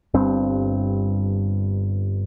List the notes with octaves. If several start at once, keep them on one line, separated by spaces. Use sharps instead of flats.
G1 G2 C4